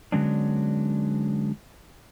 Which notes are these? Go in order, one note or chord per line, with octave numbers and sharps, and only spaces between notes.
D3 F#3 G#3 B3 C#4 D4